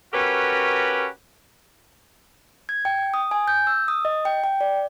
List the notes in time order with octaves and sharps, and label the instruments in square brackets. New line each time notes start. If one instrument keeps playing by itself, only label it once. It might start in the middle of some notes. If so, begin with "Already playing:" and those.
[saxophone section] C#4 F#4 G4 A#4 B4
[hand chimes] G#6
G5
D#6
G#5
G6
E6
D#6
D#5
G5
G5
D5